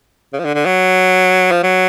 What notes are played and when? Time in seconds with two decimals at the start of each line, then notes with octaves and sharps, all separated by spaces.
0.33 C#3
0.39 F3
0.44 D3
0.55 D3
0.66 F#3
1.51 F3
1.63 F#3